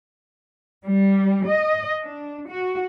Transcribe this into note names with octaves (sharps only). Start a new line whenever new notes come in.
G3
D#5
D4
F#4